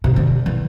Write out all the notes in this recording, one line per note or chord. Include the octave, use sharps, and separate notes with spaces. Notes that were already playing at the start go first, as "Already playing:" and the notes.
C3
D3
E3